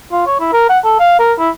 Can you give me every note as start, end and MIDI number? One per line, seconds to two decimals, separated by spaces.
0.11 0.24 65
0.27 0.38 73
0.40 0.48 64
0.53 0.69 70
0.69 0.79 78
0.84 0.98 69
1.00 1.18 77
1.20 1.33 70
1.39 1.49 64